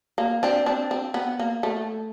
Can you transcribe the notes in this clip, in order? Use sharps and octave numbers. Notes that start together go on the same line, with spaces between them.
A#3
C4 D4
C4 D4
C4
B3
A#3
A3